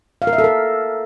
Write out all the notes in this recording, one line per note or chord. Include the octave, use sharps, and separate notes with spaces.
F5
A#4
E5
A4
A#4